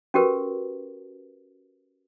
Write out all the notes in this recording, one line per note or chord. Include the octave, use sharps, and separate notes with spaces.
C#4 F#4 G4 A#4 B4